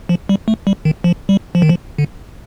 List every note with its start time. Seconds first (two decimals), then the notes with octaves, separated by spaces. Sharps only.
0.09 F3
0.29 G3
0.48 A3
0.67 G3
0.85 D#3
1.04 F3
1.29 G3
1.55 F3
1.62 D#3
1.69 F3
1.98 D3